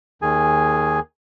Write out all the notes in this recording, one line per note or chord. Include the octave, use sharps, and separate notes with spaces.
D#2 D#3 G#4 G#5